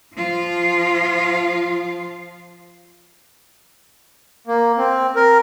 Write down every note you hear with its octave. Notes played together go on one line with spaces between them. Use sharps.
F3 F4
A#3
C4
A#4